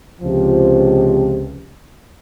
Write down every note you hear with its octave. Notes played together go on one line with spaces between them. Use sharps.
C#2 C3 F3